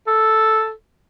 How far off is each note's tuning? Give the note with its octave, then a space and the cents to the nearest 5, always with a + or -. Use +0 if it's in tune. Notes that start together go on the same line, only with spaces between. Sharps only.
A4 -5